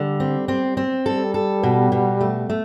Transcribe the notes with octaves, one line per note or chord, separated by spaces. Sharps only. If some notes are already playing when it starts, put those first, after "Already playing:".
Already playing: D3 G3
C4
C4
C4
G3 A4
A4
B2
B2
A3
A3